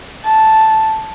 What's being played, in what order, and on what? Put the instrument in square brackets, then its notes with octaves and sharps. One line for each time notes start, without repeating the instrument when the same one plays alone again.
[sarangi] A5